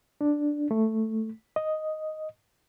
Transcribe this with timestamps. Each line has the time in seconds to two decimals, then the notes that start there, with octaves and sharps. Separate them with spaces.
0.21 D4
0.71 A3
1.56 D#5